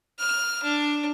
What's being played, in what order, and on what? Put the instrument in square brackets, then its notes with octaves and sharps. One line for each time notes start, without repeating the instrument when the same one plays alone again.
[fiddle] F6
D4